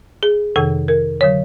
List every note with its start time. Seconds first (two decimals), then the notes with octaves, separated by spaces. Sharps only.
0.23 G#4
0.56 F2 C3 D#3 A4
0.88 A#4
1.21 D3 F#3 C#5